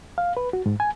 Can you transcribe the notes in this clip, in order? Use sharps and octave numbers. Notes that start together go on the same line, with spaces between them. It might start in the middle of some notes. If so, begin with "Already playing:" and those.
F5
B4
F#4
G#2
G#5